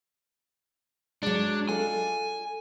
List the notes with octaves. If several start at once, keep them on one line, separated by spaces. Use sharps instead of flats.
F#3 G#3 D4
F4 A4 D#5 G#5